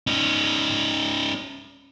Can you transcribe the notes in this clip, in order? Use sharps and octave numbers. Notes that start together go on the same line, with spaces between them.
C#4 D#4